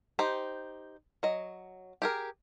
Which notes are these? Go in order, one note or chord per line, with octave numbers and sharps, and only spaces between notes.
D#4 G4 C5
F#3 D#5
G4 G#4 A#4